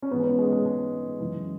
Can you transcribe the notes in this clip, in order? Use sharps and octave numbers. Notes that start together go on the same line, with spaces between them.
C#4
G#2 E3 B3
C#4
B3
G#3
G#3
G#3
F#2 C#3 E3